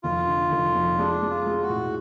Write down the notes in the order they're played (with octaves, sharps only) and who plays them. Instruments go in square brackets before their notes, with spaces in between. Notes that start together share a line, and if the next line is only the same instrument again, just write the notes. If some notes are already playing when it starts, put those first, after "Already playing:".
[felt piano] F1 [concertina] F4
[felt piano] D3
F1
F2
[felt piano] G#3 [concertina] D4
[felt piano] G#3
[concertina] F4
[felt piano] G#3
[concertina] F#4
[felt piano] A2